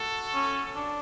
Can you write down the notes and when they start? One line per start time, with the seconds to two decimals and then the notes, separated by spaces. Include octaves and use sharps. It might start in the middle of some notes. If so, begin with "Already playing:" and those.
Already playing: F#4 A4
0.34 C#4
0.76 D4